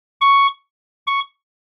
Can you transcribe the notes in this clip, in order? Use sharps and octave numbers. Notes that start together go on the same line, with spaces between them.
C#6
C#6